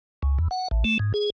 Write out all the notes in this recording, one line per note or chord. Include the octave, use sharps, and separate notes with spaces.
C#2
E2
F#5
A1
A3
G#2
G#4